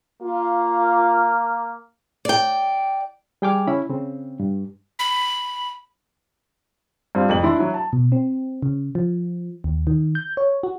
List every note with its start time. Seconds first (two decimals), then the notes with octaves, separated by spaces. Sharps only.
0.22 A#3 F4
2.25 D5 G5
3.42 G3 G#4 G5 G#5 D6 F6
3.67 C#3 C#4 E4 B5
3.89 C#3 C4
4.40 G2
4.99 B5
7.15 G2 C4 F4
7.29 F1 F2 G#2 F#7
7.43 E3 D4 E4 D5 C6
7.59 F#3 E4
7.74 A5
7.93 B2
8.12 C4
8.62 C#3
8.95 F3
9.64 D#2
9.87 D#3
10.15 G6
10.37 C#5
10.63 F#4